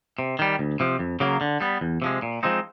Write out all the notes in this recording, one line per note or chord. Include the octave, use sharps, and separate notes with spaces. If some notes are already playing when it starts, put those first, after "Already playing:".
C3
D#3 G3
D2
C3 F3
F2
C#3 F#3 A#3
D3
G3 B3
E2
C3 F3 G#3
A#2
F3 G#3 C4 D#4